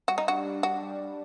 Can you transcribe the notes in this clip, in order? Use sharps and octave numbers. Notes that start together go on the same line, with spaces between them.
G3 F#4
D#4
D4 F#4
D4
G3 F#4
G3
G3